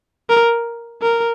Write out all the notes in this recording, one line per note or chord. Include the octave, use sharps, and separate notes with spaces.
A#4
A#4